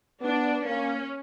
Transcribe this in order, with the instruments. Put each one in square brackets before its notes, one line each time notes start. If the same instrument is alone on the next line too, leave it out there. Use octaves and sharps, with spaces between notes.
[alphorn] B3 [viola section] D4
[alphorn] A#3 [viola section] C#4